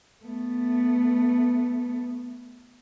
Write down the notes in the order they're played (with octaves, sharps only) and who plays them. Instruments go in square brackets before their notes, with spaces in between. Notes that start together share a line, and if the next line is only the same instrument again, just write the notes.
[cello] A3 B3